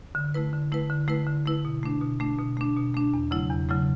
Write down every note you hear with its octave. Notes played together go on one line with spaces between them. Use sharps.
D3
A3 E4 B4
D3
A3 E4 B4
D3
A3 E4 B4
D3
A3 E4 B4
B2
A3 D4
B2
A3 D4
B2
A3 D4
B2
A3 D4
E2
C#3 F#3 A3 E4
E2
C#3 F#3 A3 E4